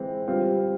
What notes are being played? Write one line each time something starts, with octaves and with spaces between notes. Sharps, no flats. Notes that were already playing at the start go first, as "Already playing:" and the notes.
Already playing: E3 G#3 C4 E4
G3 C4 F4